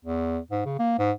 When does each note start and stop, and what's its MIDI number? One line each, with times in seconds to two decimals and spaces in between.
0.05 0.39 40
0.51 0.63 44
0.65 0.77 49
0.79 0.94 58
0.99 1.12 44